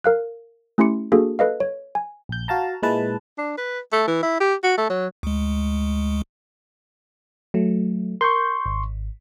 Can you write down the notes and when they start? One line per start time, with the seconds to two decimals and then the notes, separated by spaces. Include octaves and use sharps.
0.04 A#4 F5 F#6
0.78 A3 C#4 E4 G4 C6 C#7
1.12 A#3 D4 F#4 G#4 A4
1.39 A4 B4 D#5 F5
1.60 C#5
1.95 G#5
2.29 A#1 G6
2.48 F#4 F5 A5 A#5
2.83 A#2 G#3 E4 B4 A5
3.38 D4
3.58 B4
3.92 A3
4.07 E3
4.23 E4
4.40 G4
4.63 F#4
4.78 A3
4.90 F#3
5.23 D2 G#3
7.54 F#3 A3
8.21 A#4 C6 C#6 G6
8.66 G#1